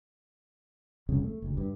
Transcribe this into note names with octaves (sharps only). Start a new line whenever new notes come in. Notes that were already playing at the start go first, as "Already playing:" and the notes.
G1 C2 F2 C#3
A3
F#1 D2
G2